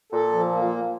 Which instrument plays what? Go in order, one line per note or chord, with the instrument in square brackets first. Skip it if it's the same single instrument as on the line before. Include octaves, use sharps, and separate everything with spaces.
[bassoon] A#2 [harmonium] A4
[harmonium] F3
A#3